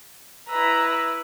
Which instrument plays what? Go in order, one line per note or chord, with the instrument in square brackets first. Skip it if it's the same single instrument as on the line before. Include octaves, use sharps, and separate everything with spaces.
[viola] E4 B4 [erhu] A#5 [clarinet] E6